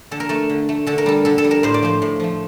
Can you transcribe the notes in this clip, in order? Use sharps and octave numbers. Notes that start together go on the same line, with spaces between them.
D3 A4
A#4
A3 A4
D3
A3
D3 A4
A#4
G3 A4
D3 A4
A4
G3
A#4
A2 C5
D5
F3 A3 C5
A2
F3 A3